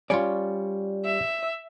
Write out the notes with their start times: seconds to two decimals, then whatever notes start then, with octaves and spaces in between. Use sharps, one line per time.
0.10 G3 C#4 F4 C#5 D5
1.05 E5